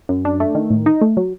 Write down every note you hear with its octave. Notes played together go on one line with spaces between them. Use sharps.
F#2
D4
A3
D#3
A2
D#4
A3
F#3